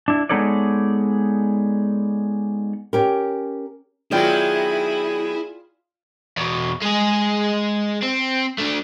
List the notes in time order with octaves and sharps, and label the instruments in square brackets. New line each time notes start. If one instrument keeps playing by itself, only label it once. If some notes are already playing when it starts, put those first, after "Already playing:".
[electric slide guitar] D4 E4
G#3 B3 D#4 A4 C#5 D5
[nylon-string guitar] C#4 G4 A#4
[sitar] D#3 F#3 B3 [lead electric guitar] E4 [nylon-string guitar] F4 D5 G5 [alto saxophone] G#4
[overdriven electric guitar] E2 B2
G#3 G#4
C4
A3 D4